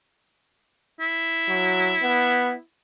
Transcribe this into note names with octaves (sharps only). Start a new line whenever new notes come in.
E4
F#3
B3